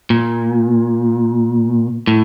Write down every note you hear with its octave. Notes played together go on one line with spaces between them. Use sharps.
A#2
A2